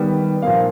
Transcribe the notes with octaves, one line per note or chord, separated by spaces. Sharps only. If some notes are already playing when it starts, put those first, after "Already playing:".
Already playing: D#3 G3 B3
A#2 F3 A#3 F5